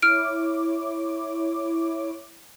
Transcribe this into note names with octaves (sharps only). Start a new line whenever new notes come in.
E4 C#5 D6 F6 D7